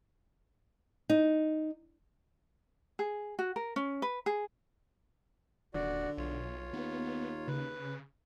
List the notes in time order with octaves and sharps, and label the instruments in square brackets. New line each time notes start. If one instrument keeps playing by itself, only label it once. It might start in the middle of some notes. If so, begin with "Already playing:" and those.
[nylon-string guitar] D#4
[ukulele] G#4
F#4
A#4
C#4
B4
G#4
[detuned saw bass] D#1 [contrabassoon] D3 [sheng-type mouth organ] F#4 D5
[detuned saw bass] B1 [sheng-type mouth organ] F4 C#5
[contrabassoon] D#2 [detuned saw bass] B3
[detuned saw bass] C#3 [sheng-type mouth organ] B4